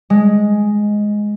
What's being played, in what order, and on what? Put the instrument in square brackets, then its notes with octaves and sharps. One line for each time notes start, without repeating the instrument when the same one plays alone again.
[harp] G#3